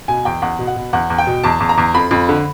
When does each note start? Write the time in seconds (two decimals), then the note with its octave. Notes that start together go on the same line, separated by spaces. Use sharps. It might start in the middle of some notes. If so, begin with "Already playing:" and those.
0.08 B2 G#5
0.25 E2 G5
0.42 E2 F#5
0.59 B2
0.67 F#5
0.76 B2
0.93 E2 F#5
1.10 E2
1.18 G5
1.27 B2
1.44 E2 A5
1.60 E2
1.69 A#5
1.78 E2
1.94 F2 B5
2.11 F2
2.29 D3